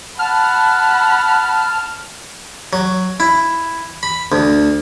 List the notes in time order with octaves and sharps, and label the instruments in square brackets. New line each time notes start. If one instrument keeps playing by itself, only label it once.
[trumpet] F#5 [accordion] A5 [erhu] B5 [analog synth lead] F6
[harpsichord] F#3
E4
B5
D2